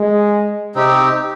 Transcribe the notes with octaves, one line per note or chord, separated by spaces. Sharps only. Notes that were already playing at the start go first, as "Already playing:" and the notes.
Already playing: G#3
C3 C4 D#4 G4